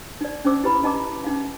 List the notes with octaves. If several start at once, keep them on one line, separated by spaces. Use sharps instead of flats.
D#4 D5
C#4 D#4 C5 D6 E6
E4 G4 B4 A#5 B5
D#4 D#5 A5 A#5 D6
C#4 D#4 F5